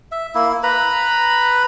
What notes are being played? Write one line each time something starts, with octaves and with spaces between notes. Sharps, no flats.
E5
A#3 E4
B4 A#5 B5